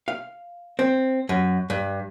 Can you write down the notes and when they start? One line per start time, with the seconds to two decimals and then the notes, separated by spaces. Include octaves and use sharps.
0.08 F5
0.79 C4
1.29 F#2
1.70 G2